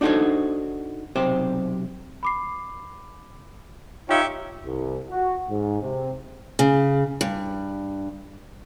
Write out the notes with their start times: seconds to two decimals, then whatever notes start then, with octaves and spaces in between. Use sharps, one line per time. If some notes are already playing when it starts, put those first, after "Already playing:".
0.01 D4 D#4 F#4 A4 C5 C#5
1.16 B1 C3 G4 C5
2.23 B5 D6 C7
4.09 D#4 F4 G4 C#5 E5 G5 C#7
4.65 C2
5.09 F#4
5.50 G#2
5.82 C3
6.59 C#3
7.21 G2